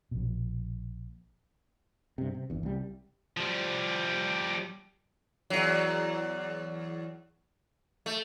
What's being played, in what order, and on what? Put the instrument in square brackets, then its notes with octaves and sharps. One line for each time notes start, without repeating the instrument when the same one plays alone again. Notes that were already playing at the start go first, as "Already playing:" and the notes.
[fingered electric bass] A#1 B2
[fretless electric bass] G2 C3
C3
G1 E2
C2 G3
[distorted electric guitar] F3 G3
[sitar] E2 F#3
A3